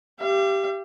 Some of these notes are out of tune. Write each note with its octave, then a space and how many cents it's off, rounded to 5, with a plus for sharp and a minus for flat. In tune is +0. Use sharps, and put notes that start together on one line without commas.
G4 +0 F5 -45